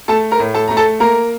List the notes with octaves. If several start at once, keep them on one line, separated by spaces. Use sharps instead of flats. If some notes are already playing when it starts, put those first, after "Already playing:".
A3 A4 A5
A#4 A#5
A2
A4 A5
A3 A#5
A4 A5
A#3 A#4 A#5